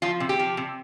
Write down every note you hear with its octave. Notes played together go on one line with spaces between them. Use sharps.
F3 F4
C3
G4
F3
C3